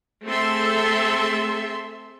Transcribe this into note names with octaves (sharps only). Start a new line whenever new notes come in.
A3 C4 G#4 A4 E5 C6